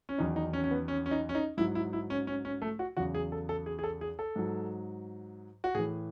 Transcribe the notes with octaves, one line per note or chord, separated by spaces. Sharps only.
C#4
E2 D#3 F#3 D#4
D#4
C#4
C#4
B3
C#4
C#4
D#4
C#4
D#4
G#2 F#3 E4
E4
E4
C#4
C#4
C#4
A3
F#4
E2 C#3 F#3 F#4
G#4
A4
A4
G#4
G#4
A4
G#4
A4
G#2 F#3
F#4
A2 E3 G#4